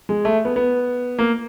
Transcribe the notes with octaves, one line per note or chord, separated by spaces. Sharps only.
G#3
A3
B3
B3
A#3